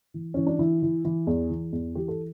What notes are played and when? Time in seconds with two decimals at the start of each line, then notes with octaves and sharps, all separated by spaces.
0.14 E3
0.34 E3 C#4
0.47 D4
0.59 E3 E4
0.82 E3
1.05 E3
1.27 E2
1.50 E3
1.72 E2
1.95 E3 G4
2.08 A4